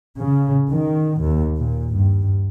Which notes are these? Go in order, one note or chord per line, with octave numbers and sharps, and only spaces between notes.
C#3
D#3
D#2
A#2
G2